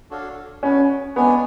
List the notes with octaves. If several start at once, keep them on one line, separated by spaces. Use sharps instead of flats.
D4 F#4 A4 C#5 F5
B3 C#4 F#4 B4
G#3 B3 D4 G#4 C#5 G#5